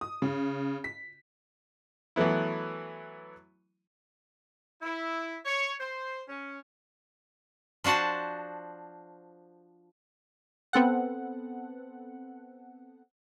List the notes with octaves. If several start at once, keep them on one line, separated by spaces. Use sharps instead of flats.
D#6
C#3
B6
E3 F#3 A3 B3 E4
E4
C#5
C5
C#4
F3 D4 F#4 C5 A5
B3 C4 A4 F#5